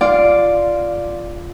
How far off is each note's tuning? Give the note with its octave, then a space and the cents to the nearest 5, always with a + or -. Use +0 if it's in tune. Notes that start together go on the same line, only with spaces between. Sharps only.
F4 -10 D5 +0 F5 +10